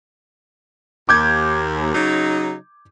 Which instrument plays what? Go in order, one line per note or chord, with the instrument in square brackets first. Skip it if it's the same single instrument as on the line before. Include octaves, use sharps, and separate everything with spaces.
[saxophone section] D#2 [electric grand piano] D6 G6 G#6
[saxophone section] C#3 F#3 D#4